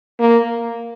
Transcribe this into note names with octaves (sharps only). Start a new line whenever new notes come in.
A#3